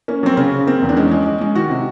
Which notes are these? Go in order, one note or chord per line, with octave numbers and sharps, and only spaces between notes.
A#3 C#4
F#3 C4
C#3 C#4
C#3
A#3 C4
E2
D4
G#3 C#4
G#3
G#3
G#3
D#3 F#4
C3